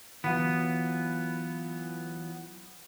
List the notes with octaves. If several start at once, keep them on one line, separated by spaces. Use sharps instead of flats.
E3 F#3 B3 F4